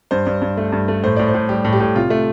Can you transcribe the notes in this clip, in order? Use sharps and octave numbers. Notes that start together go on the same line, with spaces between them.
G2 C5
G2
G2
A3
G2
A3
A2 C5
A2 D5
C5
A2
G3 G4
A2
G4
A2
C3 F4
A3